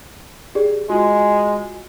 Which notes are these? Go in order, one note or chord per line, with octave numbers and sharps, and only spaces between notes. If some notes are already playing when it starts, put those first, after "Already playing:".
G4 G#4 D5
G#3 F4 F#4